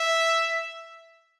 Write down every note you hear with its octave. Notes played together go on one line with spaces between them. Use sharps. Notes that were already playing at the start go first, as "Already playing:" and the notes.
Already playing: E5